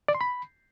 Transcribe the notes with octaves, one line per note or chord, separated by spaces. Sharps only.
D5
C6
B5